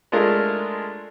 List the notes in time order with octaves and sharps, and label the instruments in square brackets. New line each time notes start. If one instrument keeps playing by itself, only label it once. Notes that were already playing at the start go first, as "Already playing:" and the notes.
[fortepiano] G#3 A3 D4 F4 A#4